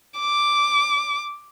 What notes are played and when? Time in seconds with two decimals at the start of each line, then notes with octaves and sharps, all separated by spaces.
0.20 D6